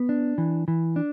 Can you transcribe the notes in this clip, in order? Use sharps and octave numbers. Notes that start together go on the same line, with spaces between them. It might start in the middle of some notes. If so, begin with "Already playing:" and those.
Already playing: B3
D4
E3
E3
D4